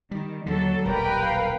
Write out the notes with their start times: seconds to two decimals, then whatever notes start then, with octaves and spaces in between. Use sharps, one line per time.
0.11 D#3 G3
0.46 D#2 D3 F#3 A4
0.85 D#1 B1 G3 A#4 B4 G5
1.22 F5